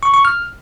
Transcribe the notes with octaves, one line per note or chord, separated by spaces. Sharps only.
C#6
C#6
F6